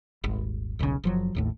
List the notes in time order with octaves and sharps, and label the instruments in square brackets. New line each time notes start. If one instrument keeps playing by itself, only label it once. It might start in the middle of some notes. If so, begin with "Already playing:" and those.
[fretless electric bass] D#1 G#1
D#1 B1 A2 C#3
F#1 F3 F#3
G#1 D#2 A2